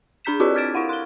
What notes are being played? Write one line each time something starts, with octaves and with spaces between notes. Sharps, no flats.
D4 G#4 A#5 G6 B6 E7
C4 E4 F4 G4 A4 D5
D6 F6 G#6 A6 D7 E7
E4 F5 F#5
C6 G7